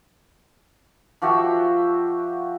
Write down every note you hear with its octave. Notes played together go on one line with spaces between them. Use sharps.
F3 F#4 G4 E5